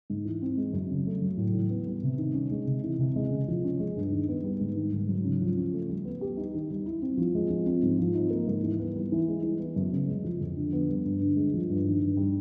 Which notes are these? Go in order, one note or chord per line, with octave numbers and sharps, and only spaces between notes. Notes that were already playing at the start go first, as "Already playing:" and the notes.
G#2
E3
C4
G#3
F#2
C#3
A3
F#3
A2
E3
B3
G3
C3
D#3
C#4
G#3
C3
E3
C3
G#3
C#3
F3
C#4
G#3
G2
D#3
B3
G3
G#2
D#3
G#2
F#3
C#3
F3
C#4
A3
G3
B3
G4
D#4
D#3
G3
E4
C4
F3
G#3
F3
C4
G#2
F3
D#4
A#3
G#2
E3
B3
G3
E3
G#3
E3
B3
F#2
C#3
G#3
F3
F2
D3
B3
G3
G2
D3
G#3
F3
G2
D#3
G2
G3